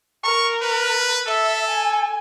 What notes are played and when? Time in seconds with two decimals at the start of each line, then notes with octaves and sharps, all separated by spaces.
0.24 A#4 C#6
0.62 B4
1.27 A4 E5
1.68 G#5